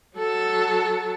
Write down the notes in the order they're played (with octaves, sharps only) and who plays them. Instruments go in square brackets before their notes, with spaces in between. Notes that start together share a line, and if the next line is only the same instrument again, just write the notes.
[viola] F#3 A4